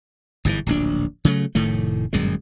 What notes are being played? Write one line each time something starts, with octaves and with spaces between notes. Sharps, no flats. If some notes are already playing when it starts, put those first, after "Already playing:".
G1 G#2 C3 E3
D1 A#1 D4
C#3 F#3 A3
F1 A2 D#3 A3
G1 F#2 A#2 G#3